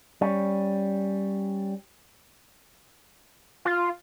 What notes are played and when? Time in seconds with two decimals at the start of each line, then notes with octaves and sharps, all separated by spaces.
0.21 G3 C#4
3.65 F4